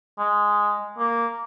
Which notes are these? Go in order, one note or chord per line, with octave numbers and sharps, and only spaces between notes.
G#3
A#3